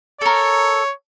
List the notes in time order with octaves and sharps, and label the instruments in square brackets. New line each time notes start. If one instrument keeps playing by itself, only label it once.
[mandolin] A4 A#4 [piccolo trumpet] C#5